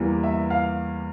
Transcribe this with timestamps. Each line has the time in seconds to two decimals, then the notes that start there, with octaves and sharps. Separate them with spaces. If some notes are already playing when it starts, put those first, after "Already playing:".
Already playing: E2 E3 G3 A#3
0.23 E5
0.50 F5